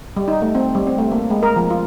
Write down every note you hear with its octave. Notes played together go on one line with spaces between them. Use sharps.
G3
D#4
A3
C4
G3
C4
A3
A#3
G#3
A#4
F3
F4